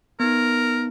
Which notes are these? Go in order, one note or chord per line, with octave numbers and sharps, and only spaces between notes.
B3 D#4 A#4